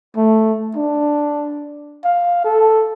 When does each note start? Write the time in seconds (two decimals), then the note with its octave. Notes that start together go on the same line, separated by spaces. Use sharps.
0.16 A3
0.76 D4
2.04 F5
2.44 A4